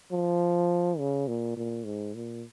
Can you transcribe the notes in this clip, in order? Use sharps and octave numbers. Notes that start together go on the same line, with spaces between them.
F3
C#3
A#2
A#2
G#2
A#2